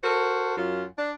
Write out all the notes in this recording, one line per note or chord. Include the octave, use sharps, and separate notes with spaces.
F#4 A4 A#4 C5
F#2 F4
D4